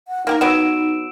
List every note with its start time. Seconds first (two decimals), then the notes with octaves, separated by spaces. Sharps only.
0.08 F#5
0.27 A#3 D#4 G4 A#4
0.41 F#3 B3 E6 D7 E7